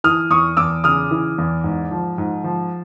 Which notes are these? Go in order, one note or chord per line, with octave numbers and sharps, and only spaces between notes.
E3 D#6 F6
E2 C#6 D#6
E2 D6 E6
C#3 D#6 F6
E3
E2
G#2
F3
G#2
F3